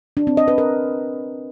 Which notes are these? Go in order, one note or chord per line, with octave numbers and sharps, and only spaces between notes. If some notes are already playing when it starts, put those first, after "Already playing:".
D4
C4
D#5
B4
A#4